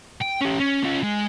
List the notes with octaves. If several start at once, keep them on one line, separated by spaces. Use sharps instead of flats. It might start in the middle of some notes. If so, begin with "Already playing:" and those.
G5
C#4 G4
C#4
C#4 F4
G#3